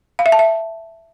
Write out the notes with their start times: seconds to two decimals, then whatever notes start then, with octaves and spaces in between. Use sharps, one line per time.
0.19 F5
0.26 E5
0.32 A5
0.39 E5